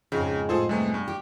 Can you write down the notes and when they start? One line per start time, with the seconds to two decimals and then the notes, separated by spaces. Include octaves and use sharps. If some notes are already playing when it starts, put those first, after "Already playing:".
0.12 F2 G#2 C#3 G#3
0.49 A2 F4 G#4 A4 C5
0.69 C3 G3 A3 B3 G#5
0.94 G2
1.08 G4